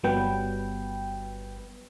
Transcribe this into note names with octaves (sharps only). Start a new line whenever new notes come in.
G1 F#3 G3 B3 B4 G5